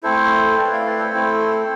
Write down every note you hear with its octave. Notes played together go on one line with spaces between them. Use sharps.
A3 C4 E4 A4 C5
A3 C4 E4 B4 D5
D5 F5
B4 D5
A4 C5
A3 C4 E4